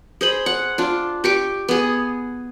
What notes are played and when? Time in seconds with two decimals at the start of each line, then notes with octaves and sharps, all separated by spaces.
0.21 G#4 C5 B5
0.46 F#5
0.78 D4 F4
1.24 G4 C#6 D6
1.68 B3 G#4